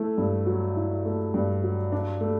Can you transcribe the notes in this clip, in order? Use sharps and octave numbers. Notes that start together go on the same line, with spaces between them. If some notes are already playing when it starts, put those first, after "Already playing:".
Already playing: A3 E4
G2
F#3
E4
A3
G2
F#3
D4
A3